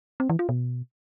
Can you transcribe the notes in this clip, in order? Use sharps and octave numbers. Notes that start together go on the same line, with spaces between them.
C4
E3
F4
B2